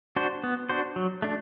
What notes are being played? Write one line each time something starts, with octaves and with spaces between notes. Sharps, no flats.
D4 F#4 C5
B3
D4 F#4 C5
F#3
A3 D4